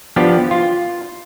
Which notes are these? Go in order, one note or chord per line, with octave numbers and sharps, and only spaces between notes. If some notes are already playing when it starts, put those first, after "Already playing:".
F3 B3 D4 G4
F4